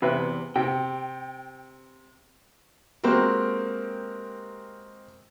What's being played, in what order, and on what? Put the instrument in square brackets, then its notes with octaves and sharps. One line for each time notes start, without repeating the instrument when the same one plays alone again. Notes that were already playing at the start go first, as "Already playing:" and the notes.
[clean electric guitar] E2 [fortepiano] C3 B4 E5
[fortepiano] C3 [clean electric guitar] G5
[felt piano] G#3 A#3 C4 F#4 G4 A#4